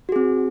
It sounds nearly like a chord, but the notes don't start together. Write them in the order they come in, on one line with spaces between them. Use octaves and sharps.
F#4 G#4 C4